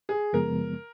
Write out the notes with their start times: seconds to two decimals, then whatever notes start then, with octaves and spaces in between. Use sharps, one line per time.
0.09 G#4
0.33 F#2 C#3 F3 G#3 B3 A#4